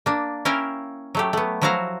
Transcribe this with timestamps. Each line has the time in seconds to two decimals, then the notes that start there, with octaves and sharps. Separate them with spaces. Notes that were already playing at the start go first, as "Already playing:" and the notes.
0.06 A#3 D4
0.45 C#4 E4 A#4 F5 G5
1.15 F#3 A3 G4
1.33 A3 B3
1.62 F3 F#3 E4 F#4 F5 A#5